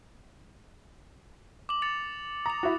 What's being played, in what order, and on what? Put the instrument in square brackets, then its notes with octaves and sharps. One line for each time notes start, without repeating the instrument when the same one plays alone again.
[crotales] D6 F#7
A6 C#7 F7
[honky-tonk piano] A#5 [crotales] D#6 F7
[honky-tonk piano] E4 F#4